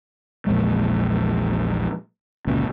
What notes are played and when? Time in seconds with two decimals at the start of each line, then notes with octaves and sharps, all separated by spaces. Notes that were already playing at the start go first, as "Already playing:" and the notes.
0.47 A#1 E2 A#2 G#3
2.47 G1 C#2 A#2 C#4